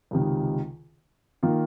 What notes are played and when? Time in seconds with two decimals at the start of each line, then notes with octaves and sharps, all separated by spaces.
0.11 C#2 C3 D#3
1.43 D#3 A#3 F4 A#4